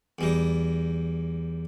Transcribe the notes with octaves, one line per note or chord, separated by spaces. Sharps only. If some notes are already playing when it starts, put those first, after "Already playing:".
E2 G3 D#4